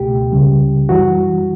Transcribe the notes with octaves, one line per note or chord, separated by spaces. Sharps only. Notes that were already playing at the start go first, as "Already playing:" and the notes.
Already playing: C#2 B2 A3 G4
C#2 C#3 G3
F#2 E3 G3 F#4